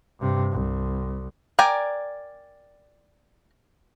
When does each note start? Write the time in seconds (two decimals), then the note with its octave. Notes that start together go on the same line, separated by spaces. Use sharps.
0.20 G2 C3
0.52 C2
1.59 A#4 D5 G5 G#5